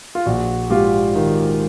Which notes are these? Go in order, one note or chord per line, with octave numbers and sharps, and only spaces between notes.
F4
A#1 F#4
G#2 F4 G4
D#3